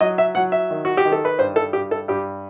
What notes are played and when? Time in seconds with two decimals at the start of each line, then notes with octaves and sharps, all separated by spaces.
0.01 F#3 D#5
0.18 E5
0.35 F#3 F#5
0.52 E5
0.71 D#3
0.85 F#4
0.97 G4
1.05 D#3
1.12 A4
1.25 B4
1.39 G2 C5
1.56 A4
1.73 G2 G4
1.91 A4
2.08 G2 G4